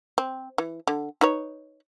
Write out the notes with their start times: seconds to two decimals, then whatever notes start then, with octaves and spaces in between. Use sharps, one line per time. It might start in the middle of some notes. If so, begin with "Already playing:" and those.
0.18 C4
0.58 E3
0.87 D3
1.21 D#4 B4 C#5